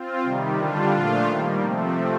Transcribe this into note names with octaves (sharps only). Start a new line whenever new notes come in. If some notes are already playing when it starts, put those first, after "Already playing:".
Already playing: C4 F4
C3 D#3 G3
D3 G3 D4 F4
A#2 F3 A3 D4 F4
D#3 G3 A#3
C3 F3 A3 C4